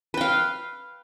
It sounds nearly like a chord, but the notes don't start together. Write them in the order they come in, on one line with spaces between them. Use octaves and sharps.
B4 G5 F5